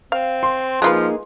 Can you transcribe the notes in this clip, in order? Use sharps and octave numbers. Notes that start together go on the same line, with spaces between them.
C4 F5
C6
F3 G#3 A#3 D#4 F4 G#4 B4